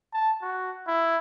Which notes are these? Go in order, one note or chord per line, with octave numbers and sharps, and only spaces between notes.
A5
F#4
E4